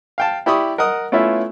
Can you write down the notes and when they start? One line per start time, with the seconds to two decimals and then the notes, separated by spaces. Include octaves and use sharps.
0.18 F5 G5 A5
0.46 E4 G4 D5 B5 C#6 D#6
0.78 A#4 D#5 F#5 D#6
1.12 A3 B3 C#4 E4 F4 E5